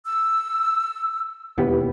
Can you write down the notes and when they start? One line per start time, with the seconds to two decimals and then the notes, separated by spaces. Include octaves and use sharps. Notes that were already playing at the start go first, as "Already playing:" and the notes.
0.06 E6
1.58 E1 D#2 B3 E4 G4 B4